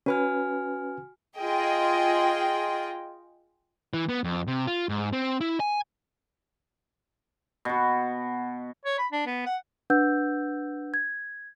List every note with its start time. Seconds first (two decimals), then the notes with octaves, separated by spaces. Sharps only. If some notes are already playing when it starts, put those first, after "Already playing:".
0.06 C#4 F#4 B4 G#5 F6
1.38 F4 G#4 D#5 G5
3.94 E3
4.09 B3
4.24 F2
4.47 C3
4.67 F4
4.89 G#2
5.13 C4
5.41 E4
5.60 G#5
7.65 B2 F#4
8.85 C#5
8.99 B5
9.12 D4
9.26 B3
9.46 F#5
9.90 D4 B4 F#5 E6 G6
10.94 G#6